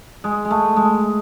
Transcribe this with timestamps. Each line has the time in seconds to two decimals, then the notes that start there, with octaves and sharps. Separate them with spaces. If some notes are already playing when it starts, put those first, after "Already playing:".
0.24 G#3
0.45 G#3
0.50 A3
0.77 G#3